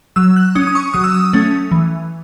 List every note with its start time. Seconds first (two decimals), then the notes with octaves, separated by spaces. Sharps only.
0.16 F#3 E6
0.36 F#6
0.55 C#4 D#6
0.67 D#6
0.75 C#6
0.94 F#3 D#6
1.04 E6
1.14 D#6
1.33 A3 C#4
1.72 E3